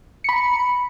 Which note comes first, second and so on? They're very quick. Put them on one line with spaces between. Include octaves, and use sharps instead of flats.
C#7 B5 A#5